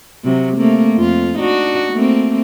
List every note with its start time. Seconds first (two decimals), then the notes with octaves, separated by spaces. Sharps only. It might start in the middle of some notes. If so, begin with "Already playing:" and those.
0.25 C3 F#3
0.56 A3 A#3 C4
0.96 F2 F4
1.37 D4 D#4 F#4
1.93 A3 A#3 C4